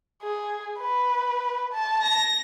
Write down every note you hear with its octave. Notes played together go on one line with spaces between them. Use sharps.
G#4
B4
A5
A#6